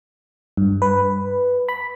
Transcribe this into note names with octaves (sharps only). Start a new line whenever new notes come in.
G2
B4
B5